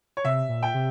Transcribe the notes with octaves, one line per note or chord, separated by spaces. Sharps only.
C#5
C3 E5
A#2
G5
C3